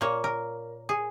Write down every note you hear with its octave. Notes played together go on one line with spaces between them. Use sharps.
A#2 A#3 C#5
A#4
G#4